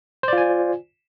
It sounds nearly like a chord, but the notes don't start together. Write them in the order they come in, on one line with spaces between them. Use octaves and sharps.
C5 D5 F4 G#5